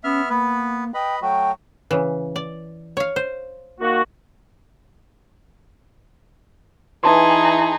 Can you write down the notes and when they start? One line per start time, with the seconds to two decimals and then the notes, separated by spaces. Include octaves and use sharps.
0.04 B3 C#4 E5 F6
0.30 A#3 B3 B4
0.94 B4 D#5 G5 B5
1.22 F#3 A3 F#4 G5
1.91 C#3 E3
2.36 D5
2.97 C#5 F5
3.16 C5
3.80 D#3 A#3 F#4
7.04 E3 D#4 G#4 A5 C6